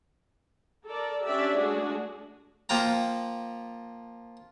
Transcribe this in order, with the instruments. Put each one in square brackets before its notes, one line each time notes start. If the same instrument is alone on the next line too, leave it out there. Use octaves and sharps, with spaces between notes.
[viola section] A4 A#4 D5
C#4 D4 G4 D5 E5
G#3 A3 D4 F#4 G#4
[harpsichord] F3 A#3 G5 A#5